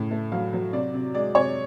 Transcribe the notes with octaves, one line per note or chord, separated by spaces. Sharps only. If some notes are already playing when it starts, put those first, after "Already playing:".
Already playing: A2 C#3
A3
F#3 F5
F#3
C3 D5
C3
G#3 D5
C3 C#5